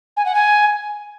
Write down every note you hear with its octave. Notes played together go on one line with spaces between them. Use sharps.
G#5
F#5
G#5